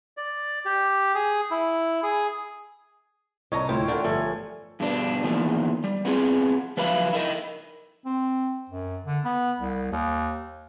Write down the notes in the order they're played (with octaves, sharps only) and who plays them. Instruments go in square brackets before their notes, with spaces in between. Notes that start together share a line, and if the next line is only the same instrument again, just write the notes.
[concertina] D5
G4
G#4
E4
G#4
[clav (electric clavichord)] C2 [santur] C#5 [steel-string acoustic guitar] D#5 A5 A#5
[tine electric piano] D2 A2 G5 [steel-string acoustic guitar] E4 [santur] F4
[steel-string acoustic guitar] D3 [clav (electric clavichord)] A3 D4 [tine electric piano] A#4 G5
[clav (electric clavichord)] G1 F3 [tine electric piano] A3 [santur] A4 [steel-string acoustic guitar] G#5
[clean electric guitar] G2 B2 D4
E2 A#2 D#3 F3
G3
B3 C4 F4 G#4
F3 F#3 B4 E5 F5 B5
E4 A#4 D#5
[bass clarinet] C4
F#2
D3
B3
C2
D#2